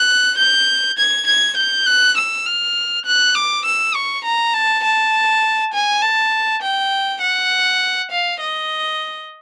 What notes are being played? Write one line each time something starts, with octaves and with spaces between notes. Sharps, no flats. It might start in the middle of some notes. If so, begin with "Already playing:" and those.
Already playing: F#6
G6
G#6
G#6
G6
F#6
E6
F6
F#6
D6
E6
C#6
A#5
A5
A5
G#5
A5
G5
F#5
F5
D#5